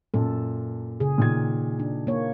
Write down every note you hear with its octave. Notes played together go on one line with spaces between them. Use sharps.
F#2 A#2 A4
C#3 G#4
A#2 D#3 G#6
D4
A#3 C#5